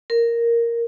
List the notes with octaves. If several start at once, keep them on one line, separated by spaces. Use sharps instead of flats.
A#4